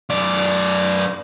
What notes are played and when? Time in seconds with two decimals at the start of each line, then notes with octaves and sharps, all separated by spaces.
0.09 F#2 D5